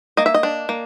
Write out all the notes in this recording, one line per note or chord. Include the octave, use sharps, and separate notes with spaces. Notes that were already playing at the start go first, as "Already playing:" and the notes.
A#3 D#5
E5
D#5
D4
A#3